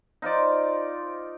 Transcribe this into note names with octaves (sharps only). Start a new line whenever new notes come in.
D#4 F4 C5 D5